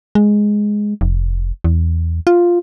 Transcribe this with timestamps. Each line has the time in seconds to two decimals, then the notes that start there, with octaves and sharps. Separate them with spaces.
0.15 G#3
1.01 F1
1.64 E2
2.27 F4